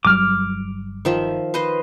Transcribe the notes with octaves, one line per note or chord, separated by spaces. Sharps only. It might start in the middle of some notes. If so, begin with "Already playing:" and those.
G1 F#3 G3 D6 F6
D#3 F3 E5
B4 C5 D#5